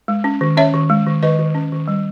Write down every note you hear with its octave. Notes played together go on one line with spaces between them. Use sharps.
G#3
C#4
D#3
C#4 C#5 E5
D#3
G#3
D#3
D#3 B4 D#5
D#3
C#4
D#3
G3